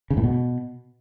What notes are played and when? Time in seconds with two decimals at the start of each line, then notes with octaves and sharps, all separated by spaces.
0.10 C#3
0.17 A2
0.23 B2